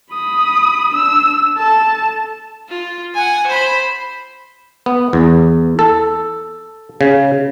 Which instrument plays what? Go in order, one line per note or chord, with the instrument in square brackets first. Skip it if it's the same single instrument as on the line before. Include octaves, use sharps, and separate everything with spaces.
[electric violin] B5 D#6
D4 E6
A4 A5
[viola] F4
F#5 G#5
C5 B5
[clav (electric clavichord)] B3
E2
A4
C#3